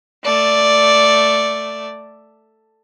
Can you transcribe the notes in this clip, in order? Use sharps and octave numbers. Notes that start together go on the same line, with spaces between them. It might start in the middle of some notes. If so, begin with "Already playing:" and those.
A3 D5